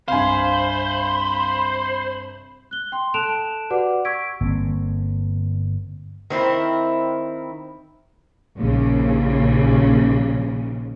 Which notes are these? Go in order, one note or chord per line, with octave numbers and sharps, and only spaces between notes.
C2 G2 C5 F5 G#5 B5
F#6 G7
G5 C6
A4 A5 F#6 D7 E7 F7
F#4 G4 B4 D5 F#5 D6
C#6 E6 G#6 B6 D7
G1 A#3 C4
D#3 C4 E4 A#4
A#1 D#2 C#3